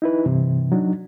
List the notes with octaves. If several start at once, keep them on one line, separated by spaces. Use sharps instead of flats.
D#4 E4 B4
G2 C3 E3
F#3 D4 D#4